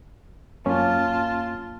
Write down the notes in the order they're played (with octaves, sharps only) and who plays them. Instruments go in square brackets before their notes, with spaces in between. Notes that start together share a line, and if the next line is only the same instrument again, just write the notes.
[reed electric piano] F#2 A#3 C#4 [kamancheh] F4 A5